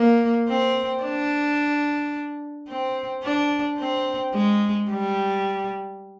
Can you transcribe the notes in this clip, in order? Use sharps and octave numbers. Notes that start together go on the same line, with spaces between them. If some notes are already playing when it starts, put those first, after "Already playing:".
Already playing: A#3
C4
D4
C4
D4
C4
G#3
G3